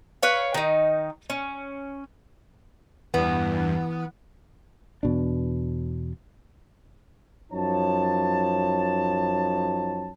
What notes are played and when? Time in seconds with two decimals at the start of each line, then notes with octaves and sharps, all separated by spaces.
0.23 B4 C#5 F5
0.54 D#3 D#4
1.30 C#4
3.14 E2 G2 E3 B3
5.03 E2 B2 D4
7.52 F#2 F3 D#4 C#5 A5